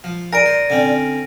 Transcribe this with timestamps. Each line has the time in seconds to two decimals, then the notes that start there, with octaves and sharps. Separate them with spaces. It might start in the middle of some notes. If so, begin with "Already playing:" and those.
0.04 F3
0.33 A#4 D5 A#6 D7 D#7
0.46 C5
0.70 D3 C4 C#4